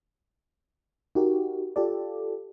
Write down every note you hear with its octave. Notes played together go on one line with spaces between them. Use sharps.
D#4 F#4 G4 A#4
F4 G4 A4 D5